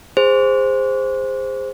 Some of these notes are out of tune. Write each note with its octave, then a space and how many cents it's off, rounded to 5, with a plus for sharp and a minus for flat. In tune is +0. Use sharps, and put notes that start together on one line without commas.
G#4 -25 C5 +0